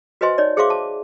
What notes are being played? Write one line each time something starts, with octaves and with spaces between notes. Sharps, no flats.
F#4 B4 C5 D#5 G#5 C6
D#4 C#5 D5
G#4 C5 E5 F5 C6 D6
A5